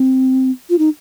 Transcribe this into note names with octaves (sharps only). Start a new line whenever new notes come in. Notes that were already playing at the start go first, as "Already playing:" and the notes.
Already playing: C4
F4
D#4